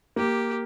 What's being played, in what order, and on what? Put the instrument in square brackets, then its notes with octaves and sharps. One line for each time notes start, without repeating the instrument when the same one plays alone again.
[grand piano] A#3 [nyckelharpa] G4